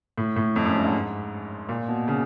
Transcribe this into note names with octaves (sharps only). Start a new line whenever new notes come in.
A2
A2
F2
F#2
G2
G#2
A#2
B2
C#3